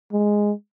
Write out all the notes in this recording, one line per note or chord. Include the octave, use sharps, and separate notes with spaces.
G#3